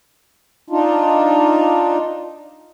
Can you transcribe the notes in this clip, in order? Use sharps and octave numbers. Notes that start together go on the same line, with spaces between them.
D4 D#4 F4